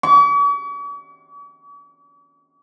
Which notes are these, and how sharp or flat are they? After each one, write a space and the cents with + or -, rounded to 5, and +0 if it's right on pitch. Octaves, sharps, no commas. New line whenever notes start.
C#6 +45